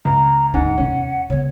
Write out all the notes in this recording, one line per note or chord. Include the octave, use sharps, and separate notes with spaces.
C#2 A#5
D2 G#2 A#3 F#5
E2 C3 C#4
C#3 B3 C#5